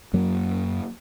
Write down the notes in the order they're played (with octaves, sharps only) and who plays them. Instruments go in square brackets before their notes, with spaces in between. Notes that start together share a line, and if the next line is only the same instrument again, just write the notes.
[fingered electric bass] F#2 F#3 A#3